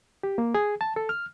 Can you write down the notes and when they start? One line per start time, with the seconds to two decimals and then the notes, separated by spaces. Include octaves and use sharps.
0.23 G4
0.38 A#3
0.54 G#4
0.81 A5
0.96 A4
1.09 F6